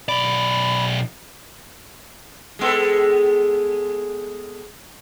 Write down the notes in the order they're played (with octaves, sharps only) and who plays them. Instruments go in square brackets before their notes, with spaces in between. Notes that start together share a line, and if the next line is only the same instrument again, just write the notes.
[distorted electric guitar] B1 D5 [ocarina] B5
[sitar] G#3 B3 A4